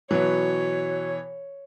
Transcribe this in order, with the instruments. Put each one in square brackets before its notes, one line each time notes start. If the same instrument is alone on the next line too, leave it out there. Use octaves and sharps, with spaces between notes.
[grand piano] B2 E3 [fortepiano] F#3 [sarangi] C#5